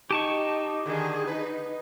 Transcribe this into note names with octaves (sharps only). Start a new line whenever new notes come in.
D#4 G4 A5 C#6
D3 D#3 G#4
D#4 B4